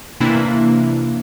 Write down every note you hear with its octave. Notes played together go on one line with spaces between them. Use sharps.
C3 E3 A#3 D4 E4